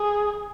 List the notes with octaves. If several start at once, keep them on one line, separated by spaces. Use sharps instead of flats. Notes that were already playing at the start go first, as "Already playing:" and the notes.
Already playing: G#4